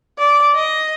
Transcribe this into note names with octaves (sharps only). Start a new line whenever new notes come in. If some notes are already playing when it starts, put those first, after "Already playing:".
D5
D#5